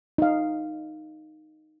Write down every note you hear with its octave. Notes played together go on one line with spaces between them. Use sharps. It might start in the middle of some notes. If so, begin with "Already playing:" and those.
D#4 F5